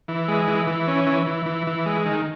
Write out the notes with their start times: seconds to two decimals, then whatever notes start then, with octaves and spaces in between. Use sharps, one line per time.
0.08 E3
0.28 G#3
0.47 E3
0.67 E3
0.87 C#4
1.06 E3
1.27 E3
1.46 E3
1.67 E3
1.86 G#3
2.06 D#3